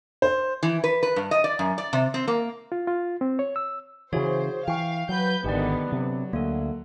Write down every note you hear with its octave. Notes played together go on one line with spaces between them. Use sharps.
C5
E3
B4
B4
G2
D#5
D5
F#2
D5
C3
C4
A#3
F4
F4
C4
C#5
E6
C#3 E3 F#4 G#4 C5 C#5
E3 F5 G5 C#6
F#3 B4 G6
G#1 D3 D#3 B3 G4 D5
C3 F#3
D2 A#3 A4